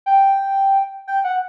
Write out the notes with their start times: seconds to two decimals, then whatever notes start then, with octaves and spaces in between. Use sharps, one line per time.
0.06 G5
1.07 G5
1.24 F#5